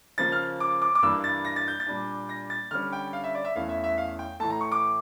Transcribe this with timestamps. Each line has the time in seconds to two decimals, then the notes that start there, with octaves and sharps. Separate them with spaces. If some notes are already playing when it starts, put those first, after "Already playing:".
0.18 C#3 F3 A#3 A6
0.32 F6
0.60 D6
0.82 D6
0.95 D6
1.02 G2 E3 G3 A#3 D4 E6
1.24 A6
1.45 A#6
1.56 A6
1.68 G6
1.80 A6
1.87 A#2 G3 D4
2.29 A#6
2.50 A6
2.71 D3 G3 C#4 F6
2.93 G5
3.13 F5
3.24 E5
3.35 D5
3.45 E5
3.55 E2 E3 A3 C#4 F5
3.69 E5
3.84 E5
3.98 F5
4.19 G5
4.40 A2 E3 A3 A5
4.50 A#5
4.61 C#6
4.72 D6